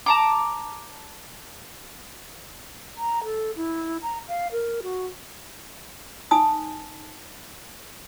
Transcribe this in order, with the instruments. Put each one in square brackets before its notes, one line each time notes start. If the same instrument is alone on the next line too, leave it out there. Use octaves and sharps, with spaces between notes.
[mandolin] A5 A#5 D6
[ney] A#5
A4
E4
A#5
F5
A#4
F#4
[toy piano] D#4 G#5 A5 D#6